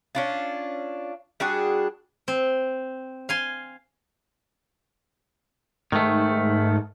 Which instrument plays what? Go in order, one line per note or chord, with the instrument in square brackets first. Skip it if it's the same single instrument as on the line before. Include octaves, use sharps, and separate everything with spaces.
[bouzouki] C#4 D4 F4
G3 D4 F#4 G#4
[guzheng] C4
F5 G#5 C6
[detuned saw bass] G#2 [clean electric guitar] D#3 A3